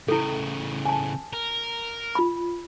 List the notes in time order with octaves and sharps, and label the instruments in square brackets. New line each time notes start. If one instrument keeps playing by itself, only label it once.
[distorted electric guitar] A2 C#3 [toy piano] E4 A4
[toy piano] G#5 A5
[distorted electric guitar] A#4
[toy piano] F4 B5